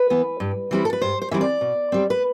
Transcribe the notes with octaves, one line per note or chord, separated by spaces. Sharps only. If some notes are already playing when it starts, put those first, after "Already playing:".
Already playing: B4
E3 B3
G2
E3 G3 C4 E4
A4
B4
G2 C5
C5
E3 G3 C4 E4 E5
D5
B2
G3 C4
B4